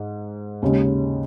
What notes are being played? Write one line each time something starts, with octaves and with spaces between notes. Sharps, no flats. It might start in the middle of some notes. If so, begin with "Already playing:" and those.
Already playing: G#2
D#2 C#3 G#3